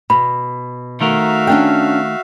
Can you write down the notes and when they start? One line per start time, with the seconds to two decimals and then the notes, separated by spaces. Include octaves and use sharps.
0.10 B2 B5
1.01 D#3 A3 F#4 A#4 E5 F5
1.47 C#4 D4 G5